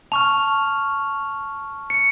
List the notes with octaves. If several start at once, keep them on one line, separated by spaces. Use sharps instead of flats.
A5 C#6 F6 F7
C#7